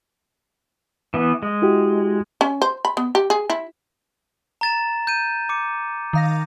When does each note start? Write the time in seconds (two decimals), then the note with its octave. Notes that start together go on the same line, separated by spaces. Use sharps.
1.14 E3 B3
1.43 G#3
1.62 E4 F#4 G4
2.41 C#4
2.62 C5
2.85 B5
2.97 B3
3.15 G4
3.30 G#4
3.50 E4
4.61 A#5 A6 E7
5.07 G6 D#7
5.49 D6 C#7
6.13 D#3 F5 A#6